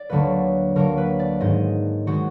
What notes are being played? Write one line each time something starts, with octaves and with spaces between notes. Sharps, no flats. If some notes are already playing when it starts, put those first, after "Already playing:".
Already playing: D5
D2 D3 F#3 A#3 B4
D2 D3 F#3 A#3 A#4
B4
D5
G#2 D#3 G#3 D#5
D#3 G#3 F#4